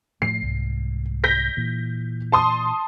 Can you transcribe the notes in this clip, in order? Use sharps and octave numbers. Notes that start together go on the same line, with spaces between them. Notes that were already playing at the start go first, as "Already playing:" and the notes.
A2 F3 A3 C7
C2 G#2
G6 A#6 B6
A#2 E3
A5 C6 D#6